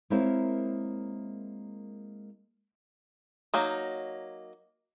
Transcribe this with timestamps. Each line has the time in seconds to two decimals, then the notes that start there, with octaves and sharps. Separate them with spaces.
0.10 G#3 A#3 C4 E4 A#4 C#5
3.54 F#3 A#3 D#4